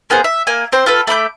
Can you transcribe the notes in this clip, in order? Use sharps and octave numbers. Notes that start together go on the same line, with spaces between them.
A#3 B3 G#4 C5
E5
A#3 G#5
C4 C5
F4 A4 B4
A3 B5 D6 G6